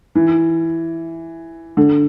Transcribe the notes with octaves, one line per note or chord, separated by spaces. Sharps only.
E3
D3